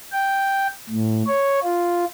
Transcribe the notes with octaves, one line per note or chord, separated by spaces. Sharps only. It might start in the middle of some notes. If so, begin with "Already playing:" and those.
G5
A2
C#5
F4